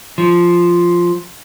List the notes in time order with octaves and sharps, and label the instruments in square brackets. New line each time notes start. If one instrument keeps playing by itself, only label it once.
[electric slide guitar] F3